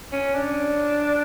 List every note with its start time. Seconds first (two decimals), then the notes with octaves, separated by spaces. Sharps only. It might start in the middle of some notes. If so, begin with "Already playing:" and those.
0.12 C#4
0.35 D4